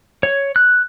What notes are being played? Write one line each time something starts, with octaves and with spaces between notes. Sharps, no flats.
C#5
F#6